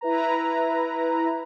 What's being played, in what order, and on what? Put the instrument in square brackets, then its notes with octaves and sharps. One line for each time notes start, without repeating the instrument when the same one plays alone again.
[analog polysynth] E4 B4 A#5